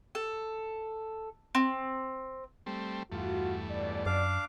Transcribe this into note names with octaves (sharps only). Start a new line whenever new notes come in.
A4
C4
G3 A3 C4
E2 G2 A3 F4 F#4
C#2 B2 D5
F#2 D4 F5 D6